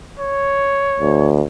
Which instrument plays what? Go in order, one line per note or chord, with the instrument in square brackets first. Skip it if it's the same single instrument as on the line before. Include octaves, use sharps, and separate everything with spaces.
[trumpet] C#5
[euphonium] D2